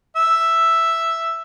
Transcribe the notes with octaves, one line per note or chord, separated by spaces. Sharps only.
E5